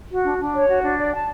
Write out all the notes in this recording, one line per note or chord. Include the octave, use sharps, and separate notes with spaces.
F#4
D4
D4
C#5
F#4
D4
D5
A5